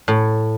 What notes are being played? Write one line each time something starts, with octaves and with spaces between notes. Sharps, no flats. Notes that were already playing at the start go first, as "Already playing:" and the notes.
A2